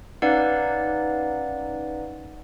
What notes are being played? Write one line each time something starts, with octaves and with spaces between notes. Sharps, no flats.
C#4 D#4 B4 D5 F5 F#5